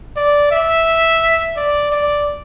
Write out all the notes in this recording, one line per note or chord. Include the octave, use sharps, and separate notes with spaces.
D5
E5
D5
D5